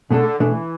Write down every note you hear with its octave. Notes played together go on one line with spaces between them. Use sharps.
B2 D3 A3 D4 A4
B2 E3 A3 D4 A4